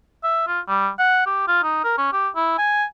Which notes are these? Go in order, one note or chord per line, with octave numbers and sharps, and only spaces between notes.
E5
F4
G3
F#5
G4
F4
D#4
A#4
C#4
G4
E4
G#5